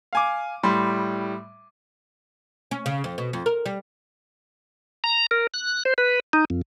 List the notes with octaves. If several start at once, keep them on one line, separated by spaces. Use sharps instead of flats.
F5 G#5 D6
A2 G3 B5 C6
C#4
C#3
F2
B2
F2
A#4
G3
A#5
A#4
F#6
C5
B4
D#4
F2